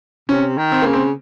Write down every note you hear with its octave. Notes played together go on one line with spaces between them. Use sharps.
C3 C#4
D#3
C4
C#3 A#3
C4